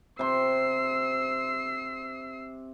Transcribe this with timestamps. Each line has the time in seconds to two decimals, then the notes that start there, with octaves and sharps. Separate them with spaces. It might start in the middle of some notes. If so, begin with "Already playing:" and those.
0.19 C3 C6 E6 C7